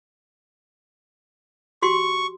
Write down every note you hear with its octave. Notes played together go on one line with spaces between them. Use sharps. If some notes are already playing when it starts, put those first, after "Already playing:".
F#4 G4 C6 C#6